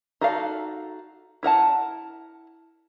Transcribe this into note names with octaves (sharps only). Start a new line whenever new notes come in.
D#4 F#4 A4 D5 F5
E4 A#4 F#5 A5